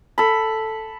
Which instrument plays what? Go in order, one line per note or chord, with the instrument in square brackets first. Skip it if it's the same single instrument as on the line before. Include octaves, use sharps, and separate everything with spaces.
[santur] A4 B5